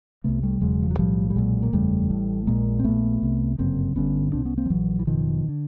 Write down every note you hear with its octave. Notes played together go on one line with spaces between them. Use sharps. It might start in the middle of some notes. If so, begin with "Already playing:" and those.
C2 C3 A3 B3
G3 A3
E1 E2 C#3 F#3 G#3
F3
F#3
B1 A2 F3 G3
G3
B1 A#2 F#3 G#3
A#3
F#1 E2 C#3 G3 A3
A1 A2
A#1 A#2 G#3 A#3
C4
A#1 A#2 A3 B3
C2 C3
G1 F#2 C#3 A#3 C4
G1 G2 D3 B3 C#4
C2 B2 C4 D4
B3 C#4
A#3 C4
F3
A#1 G#2 E3 F#3
E3
F#1 E2 B2 D#3 F3
D3